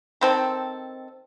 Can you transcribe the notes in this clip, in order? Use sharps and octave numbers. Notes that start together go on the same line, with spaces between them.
D#3 C4 A4